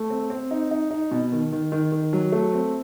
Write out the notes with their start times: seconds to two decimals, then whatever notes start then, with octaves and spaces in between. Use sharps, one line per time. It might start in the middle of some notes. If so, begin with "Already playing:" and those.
Already playing: A3
0.10 C4
0.30 C4
0.51 D#4
0.71 D#4
0.91 D#4
1.11 B2
1.32 D#3
1.52 D#3
1.72 D#3
1.92 D#3
2.13 F#3
2.32 A3
2.53 C4